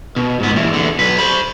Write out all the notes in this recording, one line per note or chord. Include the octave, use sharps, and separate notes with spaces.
B2
G#2 B3
A#2 E3
E2 D3
B1 B4
C5 B5